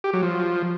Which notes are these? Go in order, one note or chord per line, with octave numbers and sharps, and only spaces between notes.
G4
F#3
F3